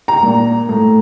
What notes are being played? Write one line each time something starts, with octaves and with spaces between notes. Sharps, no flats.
A#5
A#2
A2